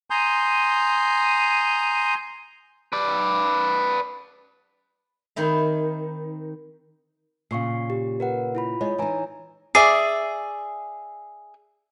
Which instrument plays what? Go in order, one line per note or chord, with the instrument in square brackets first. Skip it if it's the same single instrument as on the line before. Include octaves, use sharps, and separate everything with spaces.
[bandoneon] G#5 A#5 C6 D#6 G6
[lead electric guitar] B4 D5
[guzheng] D#3 C4 D#4 E4
[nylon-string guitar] A#2 C#3 [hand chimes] F5 C#6 C7
[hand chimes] G4
A#4 B4 F#5
E4 F4 B5
[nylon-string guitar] G#3 [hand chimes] C#5 D#5
[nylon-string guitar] E3 D#4 [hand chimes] C#5 G#5 A#5
[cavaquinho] G#4 D5 E5 [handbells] C7